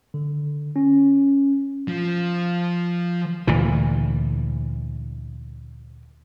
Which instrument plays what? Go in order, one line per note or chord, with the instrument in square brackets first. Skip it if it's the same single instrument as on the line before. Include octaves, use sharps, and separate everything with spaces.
[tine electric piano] D3
C#4
[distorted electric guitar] F3
[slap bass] D2 A#2 E3